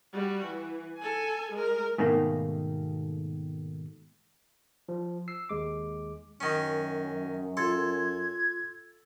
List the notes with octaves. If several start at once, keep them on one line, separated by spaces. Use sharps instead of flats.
G3 F#4
E3
A4 G#5
G#3 A#4
G#2 B2 D#3 A3 A#3
F3
E6 C7
D#2 G#3 D6
F#2 D#3 C#4
F4 A4 C6 G#6